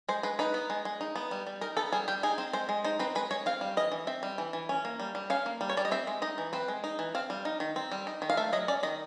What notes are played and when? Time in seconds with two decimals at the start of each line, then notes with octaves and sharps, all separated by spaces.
0.09 G#3 C5
0.23 G#3 B4
0.39 D#4 B4
0.54 B3
0.70 G#3
0.85 G#3
1.01 D#4
1.16 B3
1.31 G3
1.47 G3
1.61 D#4 A#4
1.77 B3 A4
1.92 G3 G#4
2.08 G3 G4
2.23 D#4 G#4
2.38 C4
2.53 G#3 C5
2.69 G#3
2.84 D#4 C5
2.99 C4 B4
3.15 G#3 B4
3.31 G#3 C#5
3.46 C4 F5
3.61 G3
3.77 E3 D#5
3.92 E3
4.07 C4 E5
4.23 G3
4.38 E3
4.53 E3
4.69 C#4
4.85 A#3
5.00 G3
5.15 G3
5.30 C#4 F5
5.46 A#3
5.61 G3
5.69 C#5
5.77 G3 D5
5.85 D#5
5.91 C4 E5
6.07 G#3
6.22 D#4 D#5
6.38 E3
6.53 C4 B4
6.68 G#3
6.84 D#4
6.99 E3
7.15 C4 F5
7.30 G3
7.45 D#4
7.60 D#3
7.76 C4
7.92 G3
8.07 D#4
8.22 D#3
8.30 F5
8.37 A3 E5
8.52 F#3 D#5
8.68 C#4 D5
8.83 D#3 D#5